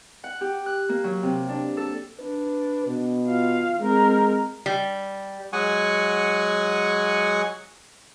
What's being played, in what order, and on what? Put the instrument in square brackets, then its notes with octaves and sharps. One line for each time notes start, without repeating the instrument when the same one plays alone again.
[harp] F#5
G4
F#6
A#3
F#3
C3
D4
A4
[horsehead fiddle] D4 [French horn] B4
[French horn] B2
[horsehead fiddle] F4 F5
[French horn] G#3 [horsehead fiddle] C4 A#4
[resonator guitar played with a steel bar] G3
[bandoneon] F#3 G#3 F#5 G#5 C#6 D#6